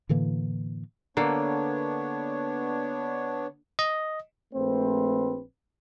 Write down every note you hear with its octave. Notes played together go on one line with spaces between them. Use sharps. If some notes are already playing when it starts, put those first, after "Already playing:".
A2 D3 E3 A#3
D3 A#3 B3 D4 C#5
D#5
A#1 A3 C4 B4 C5